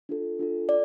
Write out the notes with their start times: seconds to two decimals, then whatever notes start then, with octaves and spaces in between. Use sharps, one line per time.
0.09 D4 F4 A4
0.39 D4 F4 A4
0.69 A4 D5